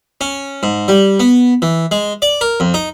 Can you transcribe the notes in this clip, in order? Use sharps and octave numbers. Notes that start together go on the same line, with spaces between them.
C#4
G#2
G3
B3
E3
G#3
D5
A#4
F2
D#4